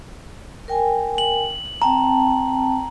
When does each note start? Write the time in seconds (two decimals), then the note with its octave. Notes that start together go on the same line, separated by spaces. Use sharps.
0.68 A#4 G5 G#5
1.18 F#7
1.82 C4 G5 A5 A#5